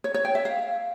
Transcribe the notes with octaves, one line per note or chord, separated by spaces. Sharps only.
C#5
C#5
G5
E5
F5